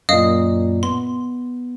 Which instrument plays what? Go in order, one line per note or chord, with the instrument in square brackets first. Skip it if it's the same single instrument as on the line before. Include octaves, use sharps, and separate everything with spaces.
[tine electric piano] F#2 A#2 [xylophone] D#5 F5 D#6
[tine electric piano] B3 [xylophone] C6